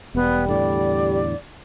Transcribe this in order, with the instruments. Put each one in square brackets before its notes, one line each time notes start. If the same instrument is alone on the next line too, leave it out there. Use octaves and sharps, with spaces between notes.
[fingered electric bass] E1 [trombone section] G3 [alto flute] B3
[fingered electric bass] E2 A2 D3 [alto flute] D5